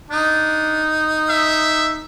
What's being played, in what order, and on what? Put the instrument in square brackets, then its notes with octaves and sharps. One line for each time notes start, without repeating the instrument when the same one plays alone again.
[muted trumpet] D4 [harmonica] D#4
[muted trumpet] E5